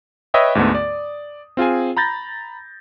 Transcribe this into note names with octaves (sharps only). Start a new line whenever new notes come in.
B4 C#5 D#5 E5 G5 D#6
D2 G#2 D3 A3 B3
D5
C4 F4 G#4 G#5
A#5 B5 G6 A6 A#6